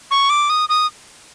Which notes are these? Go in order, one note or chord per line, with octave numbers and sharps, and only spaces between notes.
C#6
D6
D#6
D#6